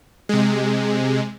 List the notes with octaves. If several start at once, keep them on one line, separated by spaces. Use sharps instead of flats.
C3 G#3